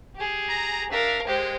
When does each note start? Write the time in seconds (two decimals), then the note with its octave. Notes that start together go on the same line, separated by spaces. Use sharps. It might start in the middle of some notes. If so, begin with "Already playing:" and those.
0.16 G4 G#4
0.47 A#5
0.92 D4 A#4 E5 F5
1.27 G#3 G4 C5